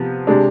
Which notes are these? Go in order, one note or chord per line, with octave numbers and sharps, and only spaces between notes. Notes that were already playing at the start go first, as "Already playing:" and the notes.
Already playing: C3 F3 B3
C3 G#3 D4